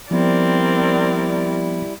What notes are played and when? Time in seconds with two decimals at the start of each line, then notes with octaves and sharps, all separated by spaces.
0.11 F3 G3 B3 C4 E4 A#4 D5